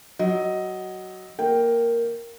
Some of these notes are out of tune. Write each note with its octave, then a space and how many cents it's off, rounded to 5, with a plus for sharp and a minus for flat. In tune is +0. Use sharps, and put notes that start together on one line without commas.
F#3 +15 D#5 +5
A#3 +0 G5 +0